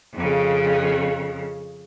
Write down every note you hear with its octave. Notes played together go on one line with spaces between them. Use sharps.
F2 C#3